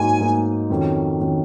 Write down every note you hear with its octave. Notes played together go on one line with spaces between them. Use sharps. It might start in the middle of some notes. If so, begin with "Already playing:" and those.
Already playing: G#2 F#3 A#3 D#4 G#5
G#2 F#3 A#3 D#4
F2 D#3 F#3 C#4
D#3 F#3 C#4